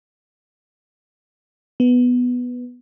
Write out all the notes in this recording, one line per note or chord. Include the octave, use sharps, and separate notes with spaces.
B3